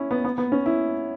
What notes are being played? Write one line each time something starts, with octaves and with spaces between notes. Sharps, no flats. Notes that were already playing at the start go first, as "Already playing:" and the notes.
Already playing: C#4 E4
B3
B3
B3
C#4
E4